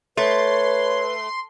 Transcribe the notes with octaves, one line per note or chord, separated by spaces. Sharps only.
A3 B4 C#5 C6